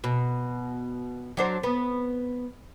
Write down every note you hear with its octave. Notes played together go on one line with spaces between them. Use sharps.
B2
F#3 D4 C5
B3